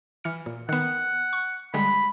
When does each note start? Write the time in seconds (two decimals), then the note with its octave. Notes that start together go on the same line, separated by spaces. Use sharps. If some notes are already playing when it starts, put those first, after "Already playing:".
0.24 E3 F6 C#7
0.46 A#2
0.69 D#3 B3 F#5
1.33 C#6
1.74 D3 G3 G#3 B5